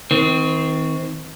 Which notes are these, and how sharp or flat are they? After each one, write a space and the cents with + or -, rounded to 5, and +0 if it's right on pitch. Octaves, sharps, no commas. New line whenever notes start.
D#3 +35 C4 -10